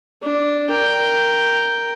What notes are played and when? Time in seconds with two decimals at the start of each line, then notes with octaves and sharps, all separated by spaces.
0.22 D4
0.70 A#4 G5